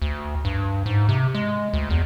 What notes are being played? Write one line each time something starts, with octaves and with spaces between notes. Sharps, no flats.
D2
G2
G#2
C3
G#3
D2
E2